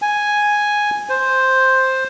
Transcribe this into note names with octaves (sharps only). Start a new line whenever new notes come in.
G#5
C5